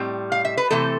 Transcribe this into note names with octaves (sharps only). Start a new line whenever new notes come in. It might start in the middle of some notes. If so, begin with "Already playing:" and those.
Already playing: A2 G3 C4
F5
E5
B4
C3 E3 A3 C4 A4